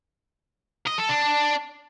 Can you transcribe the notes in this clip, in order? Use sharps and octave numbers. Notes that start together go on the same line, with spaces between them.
D#5
A4
D4